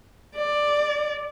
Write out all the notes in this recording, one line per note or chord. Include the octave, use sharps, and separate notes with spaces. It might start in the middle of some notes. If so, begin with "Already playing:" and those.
D5